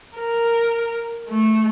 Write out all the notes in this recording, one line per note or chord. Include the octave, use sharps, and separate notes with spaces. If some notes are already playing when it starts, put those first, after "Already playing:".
A#4
A3